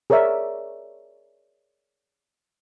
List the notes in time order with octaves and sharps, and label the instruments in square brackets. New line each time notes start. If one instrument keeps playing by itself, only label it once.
[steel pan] G#4 A#4 C#5 D5 E5